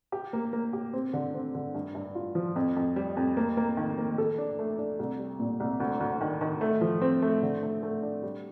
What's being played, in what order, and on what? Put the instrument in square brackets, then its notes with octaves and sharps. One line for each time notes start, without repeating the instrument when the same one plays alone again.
[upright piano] G4
A#3
A#3
G4
C4
D3
C4
D3
G2
G2
F4
F3
F2
F2
G3
F2
A#3
A#3
D#3
A#3
A4
D4
A3
D4
C2
G3
A#2
C2
D2
D2
D#3
D#3
A3
F3
C4
A3
D3
A3
A3
D4
G3